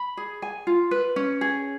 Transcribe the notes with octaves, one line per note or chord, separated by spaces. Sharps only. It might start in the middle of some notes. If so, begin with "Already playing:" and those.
Already playing: B5
G#4
G#5
F4
B4
C#4
G#4